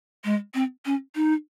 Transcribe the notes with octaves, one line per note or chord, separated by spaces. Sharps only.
G#3
C4
C#4
D#4